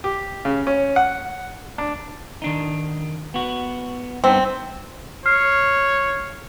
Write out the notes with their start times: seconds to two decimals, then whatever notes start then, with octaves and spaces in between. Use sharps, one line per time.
0.04 G4
0.45 C#3
0.67 C#4
0.96 F#5
1.78 D4
2.42 D#3 D4 D#4
3.34 B3 F#4
4.24 G2 B3 C4 D#4
5.26 C#5 F6 C7